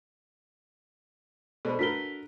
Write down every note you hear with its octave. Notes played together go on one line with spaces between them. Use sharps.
B2 G#3 D4 A4 C5 B5
A3 D4 F#4 A#4 B4 B6 G7